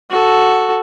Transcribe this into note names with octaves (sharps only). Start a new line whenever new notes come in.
F#4 A4